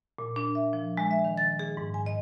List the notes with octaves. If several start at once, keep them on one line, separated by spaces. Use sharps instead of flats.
A#2
D4
E5
F3
G#3
E5
D#3
A6
G#4
G#2
G#5
D#5